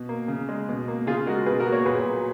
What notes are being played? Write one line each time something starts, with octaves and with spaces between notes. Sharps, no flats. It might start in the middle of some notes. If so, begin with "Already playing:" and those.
Already playing: B2
A#3
C#3
G#3
B2
A#3
C#3 F4 G#4
G#3 F#4 A#4
B2 G#4 B4
F#4 A#4
A#3
A#4 C#5
A#2 G#4 B4
F#3 A#3